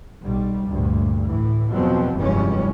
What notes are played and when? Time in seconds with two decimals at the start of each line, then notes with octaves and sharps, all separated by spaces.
0.24 B1 G3
0.68 D2 G2 A#2
1.27 A2 E3
1.71 E2 B2 F3 F#3 C4
2.16 F1 G2 E3 G3 G#3 C#4